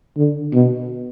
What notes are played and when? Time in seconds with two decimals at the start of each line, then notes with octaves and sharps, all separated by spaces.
0.17 D3
0.53 B2